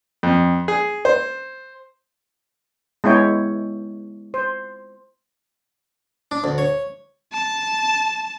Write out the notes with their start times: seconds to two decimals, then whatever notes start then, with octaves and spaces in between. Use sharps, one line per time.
0.23 F2
0.68 G#4
1.05 C5
3.04 G#3 B3 E4 C#5 G5
4.34 C5
6.31 D4
6.44 D2
6.58 C#5
7.33 A5